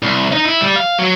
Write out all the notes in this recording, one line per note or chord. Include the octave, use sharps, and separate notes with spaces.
C2
D#4
E4
G3
F5
F#3